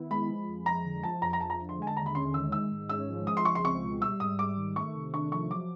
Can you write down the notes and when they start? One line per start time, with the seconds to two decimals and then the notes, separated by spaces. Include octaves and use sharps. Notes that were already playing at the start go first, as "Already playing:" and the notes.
Already playing: D#3 B3 E4
0.10 G#3 B5
0.29 F3
0.48 F2
0.66 F2 A#5
0.85 D3
1.03 F3 A5
1.22 F2 A#5
1.33 A#5
1.40 F2 A5
1.50 A#5
1.60 D3
1.69 C6
1.78 G#3 G#5
1.87 A5
1.97 D#2 A#5
2.06 B5
2.15 C#4 C6
2.34 D#3 E6
2.52 G#3 E6
2.71 G#2
2.89 C#4 E6
3.08 F3
3.27 G#3 D#6
3.37 C6
3.45 C#2 C#6
3.55 C6
3.64 C4 C#6
3.83 B2
4.01 G3 E6
4.20 G#2 D#6
4.39 G#2 D6
4.57 D#3
4.76 A3 C#6
4.94 C3
5.13 D4 C#6
5.32 F3 C#6
5.50 F#3 D6